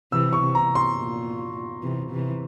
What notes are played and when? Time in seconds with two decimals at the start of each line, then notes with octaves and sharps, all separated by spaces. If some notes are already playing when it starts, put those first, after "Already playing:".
0.12 C3 E3 E6
0.33 C#6
0.40 C3
0.55 A#5
0.75 C6
0.97 A#2
1.82 C3 E3
2.11 C3 E3